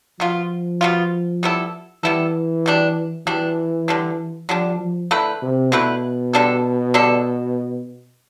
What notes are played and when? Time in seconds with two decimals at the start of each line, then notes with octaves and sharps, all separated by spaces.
0.19 B2 F3 B3 F4
0.81 B2 B3 F4
1.43 G3 B3 E4 A4
2.03 E3 G3 B3 E4 A4
2.66 B2 G3 D4
3.26 B2 E3 G3 D4
3.88 D3 G3 D4
4.49 D3 F3 G3 D4
4.80 F3
5.11 D3 A3 E4 B4
5.42 C3
5.72 B2 D3 A3 E4 B4
6.33 D3 G3 D4 A4
6.94 D3 G3 D4 A4